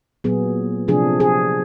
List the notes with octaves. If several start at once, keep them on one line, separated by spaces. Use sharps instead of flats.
A#2 F#3 B3 G#4
C3 F3 A3 D4 G#4
G#4